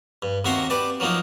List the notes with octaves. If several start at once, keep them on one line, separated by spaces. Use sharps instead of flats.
G2
D#2 C3 F#4 E5 A#5 C6
G4 B4 D5 A5
F3 F#3 A#3 D#4 F4